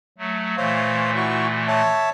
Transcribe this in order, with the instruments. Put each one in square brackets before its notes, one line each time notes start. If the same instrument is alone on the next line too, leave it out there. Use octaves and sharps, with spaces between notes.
[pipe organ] F#3 A3
[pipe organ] A#2 E3 A3 [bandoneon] C5 C#5 F5
[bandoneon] E4 F#4 C#6
C#5 E5 A5